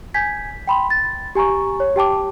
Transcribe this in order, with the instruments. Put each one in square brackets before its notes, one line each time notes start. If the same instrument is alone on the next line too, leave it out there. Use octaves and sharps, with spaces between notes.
[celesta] G#5 G6 G#6 B6
G5 B5 C6
A6
G4 G#5 A#5 C#6
C#5
G4 G5 A5 D6